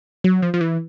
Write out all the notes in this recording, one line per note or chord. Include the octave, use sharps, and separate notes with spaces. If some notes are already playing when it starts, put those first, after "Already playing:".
F#3
F3
F3
E3